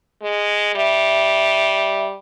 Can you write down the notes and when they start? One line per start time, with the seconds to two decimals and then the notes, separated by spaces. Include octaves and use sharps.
0.22 G#3
0.75 G3 E5